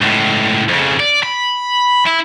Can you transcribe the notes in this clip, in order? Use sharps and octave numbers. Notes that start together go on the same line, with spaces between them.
C#2 A2
F2 C#3
D5
B5
E4